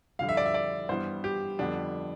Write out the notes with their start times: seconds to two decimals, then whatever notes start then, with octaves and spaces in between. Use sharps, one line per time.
0.19 F2 D3 G3 F5
0.29 E5
0.37 D5
0.46 E5
0.54 D5
0.89 G2 E3 G3 B3 C5
1.24 G4
1.59 F2 D3 G3 B3 D4